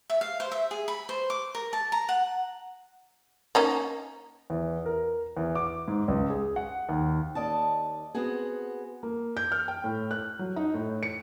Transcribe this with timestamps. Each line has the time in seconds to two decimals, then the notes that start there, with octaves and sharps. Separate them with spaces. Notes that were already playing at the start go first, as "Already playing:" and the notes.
0.10 E5
0.21 F5
0.40 C5
0.52 E5
0.71 G#4
0.88 B5
1.09 C5
1.30 D6
1.55 A#4
1.73 A5
1.92 A#5
2.09 F#5
3.55 A#3 C#4 D#4
4.50 E2
4.86 A#4
5.37 E2
5.55 D6
5.88 G#2
6.08 C#2
6.30 G#4
6.56 F#5
6.89 D#2
7.35 D#2 D5 D#5 A5
8.14 B3 C4 F#4 G#4
9.03 A#3
9.37 G6
9.52 F6
9.68 G5
9.84 A2
10.11 F#6
10.39 F#3
10.56 D#4
10.74 A2
11.03 C#7